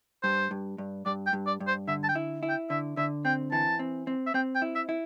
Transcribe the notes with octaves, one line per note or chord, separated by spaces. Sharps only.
G2 C5
G2
G2
G2 D5
G5
G2
D5
G2
C5
D3 E5
A5
G5
E4
E4
G5
D3 E5
D3 E5
C4 G5
E3 A5
C4
C4
E5
C4 G5
G5
E4
E5
E4